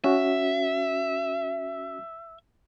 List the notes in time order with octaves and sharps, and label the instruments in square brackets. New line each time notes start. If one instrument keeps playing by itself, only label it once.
[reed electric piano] C#4 F#4 [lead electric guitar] E5